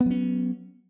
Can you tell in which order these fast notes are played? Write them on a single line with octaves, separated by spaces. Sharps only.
B3 F#3 C#4